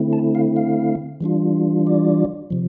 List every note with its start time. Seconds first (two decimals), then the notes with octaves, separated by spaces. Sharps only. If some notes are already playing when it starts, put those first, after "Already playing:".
Already playing: D3 A3 C4 E4
0.13 A5
0.35 F5
0.57 F5
1.21 E3 G3 D4 F4
1.87 D5
2.50 C3 F3